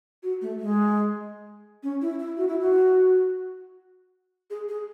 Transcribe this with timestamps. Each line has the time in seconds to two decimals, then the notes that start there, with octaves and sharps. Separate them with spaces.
0.23 F#4
0.41 A3
0.60 G#3
1.83 C#4
2.01 E4
2.19 E4
2.37 F#4
2.48 E4
2.60 F#4
4.50 G#4
4.68 G#4